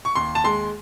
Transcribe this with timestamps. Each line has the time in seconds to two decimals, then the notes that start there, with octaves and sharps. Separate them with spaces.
0.05 C#6
0.15 D#2 C6
0.35 A5
0.44 G#3 C6